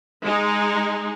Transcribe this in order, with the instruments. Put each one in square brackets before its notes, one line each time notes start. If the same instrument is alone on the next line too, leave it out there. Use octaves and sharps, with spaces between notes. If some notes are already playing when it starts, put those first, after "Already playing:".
[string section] G#3 D#4